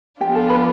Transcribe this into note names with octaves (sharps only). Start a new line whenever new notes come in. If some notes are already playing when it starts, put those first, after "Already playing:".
F3 B3 D4 F4 G4 G5
A4 A5
B4 B5